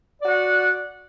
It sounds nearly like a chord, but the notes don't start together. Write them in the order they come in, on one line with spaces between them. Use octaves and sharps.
D5 F#4 F#5